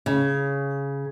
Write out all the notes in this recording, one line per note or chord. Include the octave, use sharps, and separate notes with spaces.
C#3